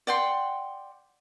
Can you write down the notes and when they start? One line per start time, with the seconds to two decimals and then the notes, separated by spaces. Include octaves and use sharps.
0.07 D5 F#5 G5 C6